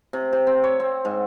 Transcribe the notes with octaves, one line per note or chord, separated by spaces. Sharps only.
C3
C3
C4
C#5
C4
G#2